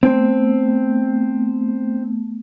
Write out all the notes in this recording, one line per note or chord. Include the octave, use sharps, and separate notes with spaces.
A3 B3 C4